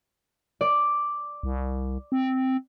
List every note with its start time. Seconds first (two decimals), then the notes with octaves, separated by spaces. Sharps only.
0.61 D5
1.43 C2
2.12 C4